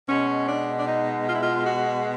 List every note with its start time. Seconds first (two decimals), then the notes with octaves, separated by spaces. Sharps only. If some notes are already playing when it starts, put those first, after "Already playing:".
0.08 B2 G#3 C#4
0.48 D4
0.78 D4
0.88 D#4
1.27 F4
1.35 E4
1.42 F4
1.67 F#4